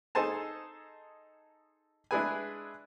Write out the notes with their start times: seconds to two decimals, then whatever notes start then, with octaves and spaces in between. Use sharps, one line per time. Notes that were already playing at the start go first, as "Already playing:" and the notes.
0.15 D#4 G#4 A4 C5 G#5 A5
2.11 G#3 D4 E4 G#4 B4 G#5